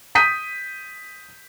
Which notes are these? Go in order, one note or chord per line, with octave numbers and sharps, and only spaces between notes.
D#6 G6 B6 D#7